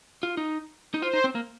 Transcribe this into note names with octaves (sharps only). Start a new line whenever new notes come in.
F4
D#4
D#4
F4 C5
D#4
C4
A#3